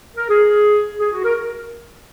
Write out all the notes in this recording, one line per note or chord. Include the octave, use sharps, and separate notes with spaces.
A#4
G#4
G#4
F#4
A#4